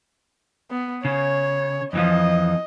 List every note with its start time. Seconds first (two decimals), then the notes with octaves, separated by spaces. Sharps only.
0.71 B3
1.05 C#3 C#5
1.93 F2 E3 F3 D#5